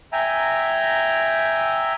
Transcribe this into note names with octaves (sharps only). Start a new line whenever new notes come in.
E5 G5 G#5 A#5